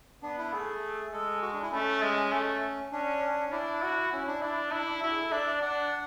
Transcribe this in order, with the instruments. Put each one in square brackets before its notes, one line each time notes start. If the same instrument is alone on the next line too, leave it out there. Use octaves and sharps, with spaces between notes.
[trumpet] B3 [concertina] D4
[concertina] E4
[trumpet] A3 [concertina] G#4
[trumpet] G#3 [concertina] A4
[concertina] F#4
D4
E4
[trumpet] A3 [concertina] C#4
[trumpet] G#3
A3
[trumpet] C#4 [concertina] D4
[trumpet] C#4
[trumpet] D4 [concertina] E4
[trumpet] F#4
[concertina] C#4 [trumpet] E4
[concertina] D4
[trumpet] D4 [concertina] E4
[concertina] E4
[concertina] D4 [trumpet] E4
[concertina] D4
D4
[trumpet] E4 [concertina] F#4
[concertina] G#4
A4
[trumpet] D4 [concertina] E5
[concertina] D5
[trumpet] D4 [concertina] F#5